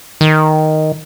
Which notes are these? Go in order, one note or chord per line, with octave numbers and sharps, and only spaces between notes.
D#3